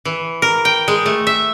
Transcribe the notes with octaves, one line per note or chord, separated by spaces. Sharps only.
E3
A#4
G5
G#3
A3
E5